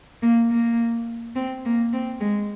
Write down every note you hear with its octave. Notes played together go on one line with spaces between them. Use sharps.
A#3
A#3
C4
A#3
C4
G#3